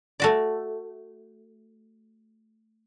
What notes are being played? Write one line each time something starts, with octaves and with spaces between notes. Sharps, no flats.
A3 F#4 D5